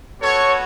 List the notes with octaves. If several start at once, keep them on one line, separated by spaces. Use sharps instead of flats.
B3 F#4 A4 C#5